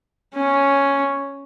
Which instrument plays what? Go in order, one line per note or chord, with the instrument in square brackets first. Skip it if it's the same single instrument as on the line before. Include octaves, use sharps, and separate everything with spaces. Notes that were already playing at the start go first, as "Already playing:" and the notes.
[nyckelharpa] C#4